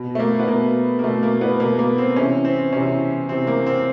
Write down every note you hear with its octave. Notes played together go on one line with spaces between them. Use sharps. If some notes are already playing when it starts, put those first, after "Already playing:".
Already playing: B2
A3
A#3
B3
B2 A#3
A#3
B2 A3
A#3
B3
B2 A#3
A#3
C4
C3 E3 C#4
C4
C3 E3 C#4
C3 E3 C4
A#3
C4